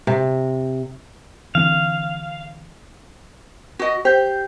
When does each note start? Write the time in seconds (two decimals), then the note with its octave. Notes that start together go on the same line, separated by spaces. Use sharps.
0.07 C3
1.55 D3 E3 C4 F5
3.79 F#4 D#5
4.05 G4 C5 G6